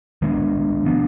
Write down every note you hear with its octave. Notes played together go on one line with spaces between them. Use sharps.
D#3 G#3 B3 D4
F3 B3 D4